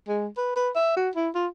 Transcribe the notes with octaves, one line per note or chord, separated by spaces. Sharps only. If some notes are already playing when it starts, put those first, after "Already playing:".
G#3
B4
B4
E5
F#4
E4
F4